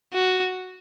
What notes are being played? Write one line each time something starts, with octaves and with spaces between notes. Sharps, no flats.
F#4